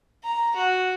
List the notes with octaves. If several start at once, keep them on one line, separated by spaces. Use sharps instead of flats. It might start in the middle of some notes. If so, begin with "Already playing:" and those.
A#5
F#4